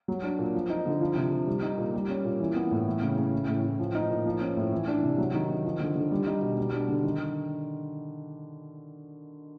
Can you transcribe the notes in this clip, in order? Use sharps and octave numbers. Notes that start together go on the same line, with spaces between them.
F#3
D4
A#2
F3
D#4
D3
F3
C3
C3
G3
D#4
A#2
G3
C#4
A#2
E3
B3
A2
E3
C#3
C#3
E3
A2
A2
F3
D#4
A#2
F3
C#4
A2
E3
D4
C3
F#3
D#3
D#3
F3
D3
D3
G3
D#4
B2
G3
D4
D3
D#3